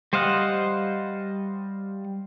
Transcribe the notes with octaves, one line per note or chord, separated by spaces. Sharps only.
G3 C5 D#5 F5 F#5